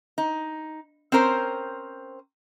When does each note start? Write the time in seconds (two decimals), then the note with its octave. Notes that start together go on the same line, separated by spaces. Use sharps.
0.18 D#4
1.12 C4 C#4 A#4 C5